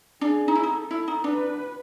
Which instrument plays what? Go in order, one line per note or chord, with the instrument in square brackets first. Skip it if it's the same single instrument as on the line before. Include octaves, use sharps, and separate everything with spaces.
[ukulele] D4 [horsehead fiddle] G#4
[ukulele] D#4
E4
D#4
[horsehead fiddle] A4
[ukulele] E4
D#4
[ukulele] D4 [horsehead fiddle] B4